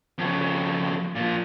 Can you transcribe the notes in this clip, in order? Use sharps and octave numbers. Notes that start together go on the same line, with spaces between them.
F2 C#3
A#2 F3